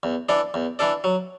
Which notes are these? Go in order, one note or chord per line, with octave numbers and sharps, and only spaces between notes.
E2
E3 D4 A4 D5
E2
E3 D4 A4 D5
F#3